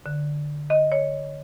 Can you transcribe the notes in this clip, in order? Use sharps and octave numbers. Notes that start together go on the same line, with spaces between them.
D3
D#5
C#5